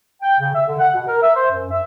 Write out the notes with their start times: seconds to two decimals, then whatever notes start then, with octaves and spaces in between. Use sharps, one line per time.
0.22 G5
0.40 C#3
0.53 E5
0.66 D3
0.79 F#5
0.94 B2
1.07 A#4
1.22 E5
1.35 C5
1.50 F#2
1.71 E5